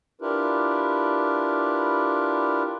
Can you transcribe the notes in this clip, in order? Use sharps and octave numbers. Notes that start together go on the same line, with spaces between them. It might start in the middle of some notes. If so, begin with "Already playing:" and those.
D4 E4 F4 G4 A#4 B4